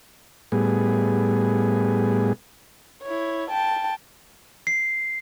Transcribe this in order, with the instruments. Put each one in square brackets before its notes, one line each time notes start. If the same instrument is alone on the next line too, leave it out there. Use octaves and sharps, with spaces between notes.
[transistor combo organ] A2 G3 B3 G#4
[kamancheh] E4 C#5
G5 A5
[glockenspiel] C7